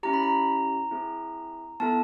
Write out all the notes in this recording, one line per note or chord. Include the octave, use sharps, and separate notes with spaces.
C#4 E4 G4 A#5
B5
A#5
C4 E4 G#4
B3 E4 A4 A5